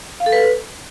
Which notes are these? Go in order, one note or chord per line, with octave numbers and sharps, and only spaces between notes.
F5
A4
B4